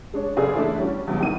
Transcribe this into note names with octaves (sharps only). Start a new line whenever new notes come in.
G#3 D4 C#5
F#1 G#4 A4 D5
E3 A3 D4 E4
G3 C#4 F#4
E2 G2 B2 F#3
G#1 D#3 E3 D#7